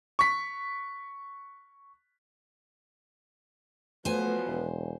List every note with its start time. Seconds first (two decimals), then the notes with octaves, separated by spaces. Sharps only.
0.19 C#6 B6
4.05 F3 F#3 A3 B3 B4 C5 G#5
4.46 E1